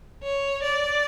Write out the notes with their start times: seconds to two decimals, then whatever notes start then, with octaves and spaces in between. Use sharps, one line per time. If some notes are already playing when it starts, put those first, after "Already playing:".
0.23 C#5
0.63 D5